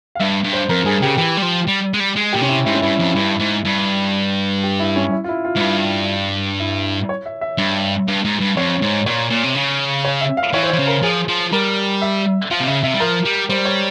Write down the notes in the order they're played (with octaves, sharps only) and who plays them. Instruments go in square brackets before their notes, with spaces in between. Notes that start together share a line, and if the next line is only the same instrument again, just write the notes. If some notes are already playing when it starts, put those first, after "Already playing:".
[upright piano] F5
[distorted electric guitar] G2 [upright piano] E5
[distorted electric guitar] G2
[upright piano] C5
[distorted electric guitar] F2 [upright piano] A#4
[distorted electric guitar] G2 [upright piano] G#4
[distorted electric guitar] C#3 [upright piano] G4
[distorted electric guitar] E3 [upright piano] G4
[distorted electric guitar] G3
F3
G3
G#3
G3
G#3
[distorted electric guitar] A#2 [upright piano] G4
[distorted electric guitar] C3 [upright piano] C#4
[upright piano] E4
[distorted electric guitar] G#2 [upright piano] E4
[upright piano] C#4
[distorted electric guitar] G2 [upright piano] E4
[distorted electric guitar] F2
[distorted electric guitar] G2 [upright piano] E4
[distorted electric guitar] G#2
G2
[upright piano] G4
E4
C#4
E4
F4
E4
F4
[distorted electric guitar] G#2
[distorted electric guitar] G2 [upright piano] E4
[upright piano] E4
C#5
E5
E5
[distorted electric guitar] G2
G2
G#2
G2
[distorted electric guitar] F2 [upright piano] C#5
[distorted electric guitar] G#2
[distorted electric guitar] A#2 [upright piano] C#5
[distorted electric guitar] A#2
C3
C#3
[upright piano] C#5
E5
F5
[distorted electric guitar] E3 [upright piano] C#5
[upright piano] C5
C#5
[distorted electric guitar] E3
C#3
[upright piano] A#4
[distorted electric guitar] F3 [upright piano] G#4
[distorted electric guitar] F3
[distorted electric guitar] G3 [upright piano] A#4
[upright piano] E5
[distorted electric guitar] F3 [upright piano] F5
[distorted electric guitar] C3
[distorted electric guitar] C#3 [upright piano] E5
[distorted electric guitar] C3 [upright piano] E5
[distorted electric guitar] G3
[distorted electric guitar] F3 [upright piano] A#4
[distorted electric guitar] G3
[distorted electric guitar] G3 [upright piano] C5
[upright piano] C#5